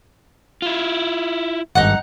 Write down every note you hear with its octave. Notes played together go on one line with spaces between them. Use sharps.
E4 F4
G#1 G2 D#4 F#5